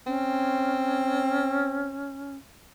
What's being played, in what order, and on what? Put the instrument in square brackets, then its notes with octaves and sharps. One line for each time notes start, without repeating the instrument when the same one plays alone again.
[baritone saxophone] C4 [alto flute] C#4